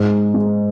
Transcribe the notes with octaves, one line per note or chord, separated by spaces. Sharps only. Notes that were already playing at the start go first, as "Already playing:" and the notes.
Already playing: G#2
G#3